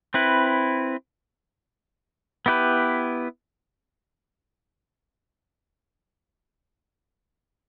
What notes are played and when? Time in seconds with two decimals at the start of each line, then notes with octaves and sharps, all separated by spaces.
0.14 C4 E4 B4
2.46 B3 E4 G4 B4